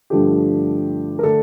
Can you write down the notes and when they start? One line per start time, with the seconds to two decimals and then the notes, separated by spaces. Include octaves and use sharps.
0.10 G2 D3 F3 A3 D4 G4
1.19 A#4
1.23 D3 A3 D4 A4